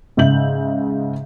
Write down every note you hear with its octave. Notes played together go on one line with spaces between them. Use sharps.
G#2 C#3 E5 G6 F#7